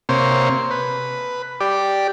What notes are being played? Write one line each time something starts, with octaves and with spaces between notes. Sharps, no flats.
C3 A#3 C5 C#5
B4
G4 D5